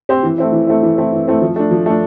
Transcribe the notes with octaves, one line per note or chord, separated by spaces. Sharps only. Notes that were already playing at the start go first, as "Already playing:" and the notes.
C4 G4 C5
E3
A3 C4 E4
E3
A3 C4 E4
E3
A3 C4 E4
E3
A3 C4 E4
F3
A3 D4
F3
A3 D4